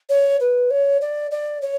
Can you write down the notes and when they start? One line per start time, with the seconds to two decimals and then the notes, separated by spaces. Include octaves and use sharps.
0.09 C#5
0.40 B4
0.70 C#5
1.01 D5
1.31 D5
1.61 C#5